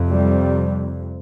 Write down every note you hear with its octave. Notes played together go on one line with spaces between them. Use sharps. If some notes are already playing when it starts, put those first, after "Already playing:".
Already playing: F2 C3
G3